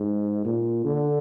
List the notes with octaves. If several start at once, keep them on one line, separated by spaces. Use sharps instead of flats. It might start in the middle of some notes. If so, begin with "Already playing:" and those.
Already playing: G#2
A#2
D3